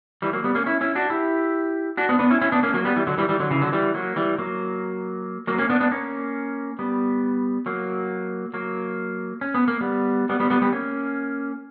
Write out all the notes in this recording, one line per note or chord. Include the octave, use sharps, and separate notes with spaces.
E3 G3
F#3 A#3
G3 B3
A#3 C#4
C#4 E4
C#4 E4
D4 F#4
E4 G4
D4 F#4
B3 D4
B3 D4
C#4 E4
C#4 E4
B3 D4
A#3 C#4
F#3 A#3
G3 B3
E3 G3
D3 F#3
E3 G3
E3 G3
D3 F#3
C#3 E3
D3 F#3
E3 G3
F#3 A#3
E3 G3
F#3 A#3
F#3 A#3
A#3 C#4
B3 D4
B3 D4
A#3 C#4
G3 B3
F#3 A#3
F#3 A#3
C#4
B3
A#3
G3 B3
G3 B3
G3 B3
G3 B3
G3 B3
A#3 C#4